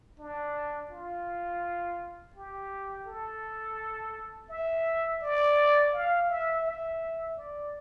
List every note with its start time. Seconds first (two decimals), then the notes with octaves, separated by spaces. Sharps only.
0.19 D4
0.91 F4
2.35 G4
3.07 A4
4.50 E5
5.22 D5
5.94 F5
6.30 E5
6.66 E5
7.37 D5